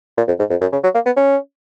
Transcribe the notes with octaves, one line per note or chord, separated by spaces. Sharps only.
A#2
F2
G#2
F2
F#2
C#3
F#3
A#3
B3
C#4